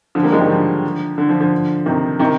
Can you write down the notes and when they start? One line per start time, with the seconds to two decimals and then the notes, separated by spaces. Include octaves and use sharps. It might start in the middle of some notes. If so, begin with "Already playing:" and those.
0.15 D3 F3
0.23 G3 A#3
0.32 F3 G#3
0.40 D#3 G3
0.50 D3 F3
1.18 D3
1.29 D3 F3
1.40 D3 F3
1.86 C3 D#3
2.20 C3 D#3